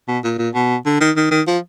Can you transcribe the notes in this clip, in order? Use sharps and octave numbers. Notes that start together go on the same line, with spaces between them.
B2
A#2
A#2
B2
D3
D#3
D#3
D#3
F3